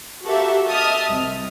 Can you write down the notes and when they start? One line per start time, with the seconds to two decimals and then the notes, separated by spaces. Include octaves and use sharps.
0.25 F#4 G4 A4 A#4 E5 F5
0.66 D#5 E5 A5 D#6 F6
1.09 C2